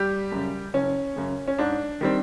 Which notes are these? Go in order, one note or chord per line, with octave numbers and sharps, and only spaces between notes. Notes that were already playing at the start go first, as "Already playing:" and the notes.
Already playing: G3 G4
F#2 C#3
F#1 C#4
F#2 C#3
C#4
G#2 D4
D#3 G3 C4